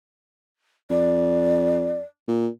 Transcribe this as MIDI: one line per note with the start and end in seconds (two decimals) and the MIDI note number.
0.90 1.98 41
0.90 1.99 74
2.28 2.48 46